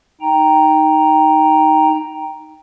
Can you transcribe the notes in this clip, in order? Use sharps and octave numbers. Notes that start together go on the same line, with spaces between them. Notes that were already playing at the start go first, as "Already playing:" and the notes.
D#4 G5 A#5